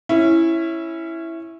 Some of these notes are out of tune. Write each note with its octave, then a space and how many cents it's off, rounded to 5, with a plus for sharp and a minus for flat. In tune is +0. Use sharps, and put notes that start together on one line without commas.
C#4 -15 E4 +0